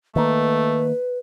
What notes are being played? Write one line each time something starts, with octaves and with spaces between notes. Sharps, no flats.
D#3 A3 A#3 B4